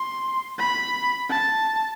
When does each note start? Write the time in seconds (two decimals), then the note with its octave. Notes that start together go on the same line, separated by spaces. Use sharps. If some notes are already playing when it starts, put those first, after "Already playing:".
Already playing: C6
0.59 B5
1.30 A5